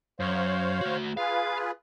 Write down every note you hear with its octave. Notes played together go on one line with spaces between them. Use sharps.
F#2 C5 C#5 F5
A3 F#4
F4 G#4 B4 F5